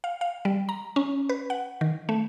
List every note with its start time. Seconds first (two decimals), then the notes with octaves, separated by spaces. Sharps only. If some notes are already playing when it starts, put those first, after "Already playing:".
0.04 F5
0.21 F5
0.45 G3
0.69 A#5
0.96 C#4
1.29 B4
1.50 F#5
1.81 D#3
2.09 A3